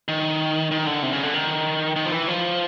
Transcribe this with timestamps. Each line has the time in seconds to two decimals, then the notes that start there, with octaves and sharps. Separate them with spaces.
0.08 D#3
0.71 D#3
0.87 D3
1.03 C3
1.13 C#3
1.23 D3
1.34 D#3
1.96 D#3
2.06 F3
2.12 E3
2.28 F3